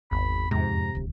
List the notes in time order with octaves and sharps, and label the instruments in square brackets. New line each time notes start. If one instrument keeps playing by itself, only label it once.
[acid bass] G#1 [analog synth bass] E2 [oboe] B5
[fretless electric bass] F2 G#2 [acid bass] C3 [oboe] A#5
[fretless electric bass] D#1 D2